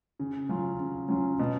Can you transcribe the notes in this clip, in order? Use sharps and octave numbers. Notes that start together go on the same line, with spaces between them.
C#3
F#3 C#4 F4
C#3
F#3 C#4 F4
B2